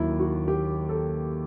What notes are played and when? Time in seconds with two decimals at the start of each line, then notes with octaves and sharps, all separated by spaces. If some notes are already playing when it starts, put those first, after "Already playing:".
Already playing: D#2 D#3 F#3 E4
0.19 F#4
0.48 G4
0.89 A4